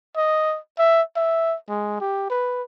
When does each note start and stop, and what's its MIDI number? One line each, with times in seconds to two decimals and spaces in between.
0.16 0.58 75
0.78 1.02 76
1.16 1.55 76
1.69 1.98 56
2.00 2.29 67
2.30 2.62 71